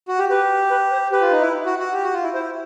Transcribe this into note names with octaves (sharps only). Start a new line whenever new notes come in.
F#4
G4
G4 B4
B4
C5
G4 B4
F4
D#4
E4
F#4
F#4
G4
F#4
F4
E4
E4 C5